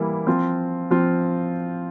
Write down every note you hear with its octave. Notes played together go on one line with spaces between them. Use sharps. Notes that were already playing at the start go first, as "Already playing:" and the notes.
Already playing: E3 G3 A#3 E4
F3 C4 F4
F3 C4 F4